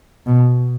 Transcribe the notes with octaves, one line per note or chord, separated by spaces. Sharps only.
B2